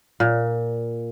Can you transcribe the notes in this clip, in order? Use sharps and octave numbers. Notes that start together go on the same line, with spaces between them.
A#2